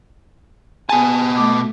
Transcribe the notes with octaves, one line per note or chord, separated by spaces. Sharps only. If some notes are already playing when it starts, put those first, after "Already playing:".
B2 G#4 G#5 A5
A3 D6